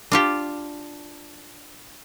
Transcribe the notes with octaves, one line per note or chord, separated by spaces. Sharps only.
D4 F4 G4